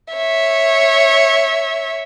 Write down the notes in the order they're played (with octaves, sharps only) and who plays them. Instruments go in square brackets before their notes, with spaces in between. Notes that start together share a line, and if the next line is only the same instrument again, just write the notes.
[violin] C#5 E5